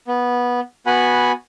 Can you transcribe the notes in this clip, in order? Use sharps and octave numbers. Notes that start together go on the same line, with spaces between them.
B3
B3 F#4 F#5 G#5 B5